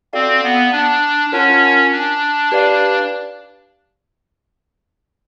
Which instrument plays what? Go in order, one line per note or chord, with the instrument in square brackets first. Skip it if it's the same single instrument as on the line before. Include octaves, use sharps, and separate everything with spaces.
[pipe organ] C4 [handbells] F#4 A4 D5 F5
[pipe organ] B3
D4
[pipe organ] C#4 [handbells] F4 A#4 C#5 F#5 A5
[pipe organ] D4
[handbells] G4 B4 D5 F5